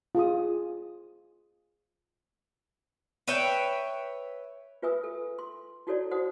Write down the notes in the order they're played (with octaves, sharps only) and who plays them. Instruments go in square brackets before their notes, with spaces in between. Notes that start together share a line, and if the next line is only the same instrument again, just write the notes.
[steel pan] F4 G#4 D#6
[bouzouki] B4 C#5 E5 G5
[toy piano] F4 B4 E5 G#5 D#6 E6
A4
C6
D#4 E4 F#4 A4 C#5 D5
D#4 F#4 C5 F#5 D#6